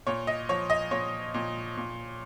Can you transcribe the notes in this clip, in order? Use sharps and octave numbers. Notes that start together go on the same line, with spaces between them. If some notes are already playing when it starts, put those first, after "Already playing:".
A#2 C#5
D#5
F3 C#5
D#5
A#2 C#5
A#2
A#2